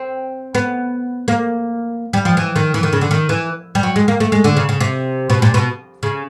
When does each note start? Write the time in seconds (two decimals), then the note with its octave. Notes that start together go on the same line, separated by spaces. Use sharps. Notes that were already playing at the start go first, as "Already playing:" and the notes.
Already playing: C4
0.55 B3
1.28 A#3
2.13 G3
2.25 F3
2.37 E3
2.56 D#3
2.74 E3
2.83 D#3
2.93 C#3
3.01 D3
3.11 D#3
3.29 E3
3.75 G3
3.83 F#3
3.96 G#3
4.08 A#3
4.20 A3
4.32 G#3
4.44 D3
4.57 C#3
4.69 C#3
4.80 C3
5.30 B2
5.42 A#2
5.54 B2
6.03 C#3